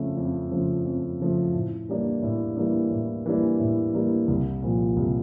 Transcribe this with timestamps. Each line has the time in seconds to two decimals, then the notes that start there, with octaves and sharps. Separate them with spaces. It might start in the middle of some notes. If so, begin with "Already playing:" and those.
Already playing: F2 C#3 F3 A3
0.17 F2
0.51 C#3 F3 A3
0.85 F2
1.19 C#3 F3 A3
1.54 A2
1.88 E3 G3 A#3 D4
2.22 A2
2.56 E3 G3 A#3 D4
2.91 A2
3.26 E3 G3 A#3 D4
3.60 A2
3.93 E3 G3 A#3 D4
4.28 C2
4.62 A#2 F3
4.97 C2